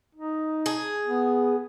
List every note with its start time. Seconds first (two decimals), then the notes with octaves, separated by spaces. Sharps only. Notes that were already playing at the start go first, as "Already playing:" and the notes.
0.15 D#4
0.66 G#4
1.06 B3